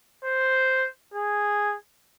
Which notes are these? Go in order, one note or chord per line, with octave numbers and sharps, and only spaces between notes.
C5
G#4